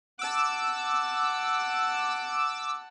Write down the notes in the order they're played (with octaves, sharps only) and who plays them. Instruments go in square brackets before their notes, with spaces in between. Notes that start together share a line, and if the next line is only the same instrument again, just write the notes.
[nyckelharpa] F#5 A5 [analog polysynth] D6 E6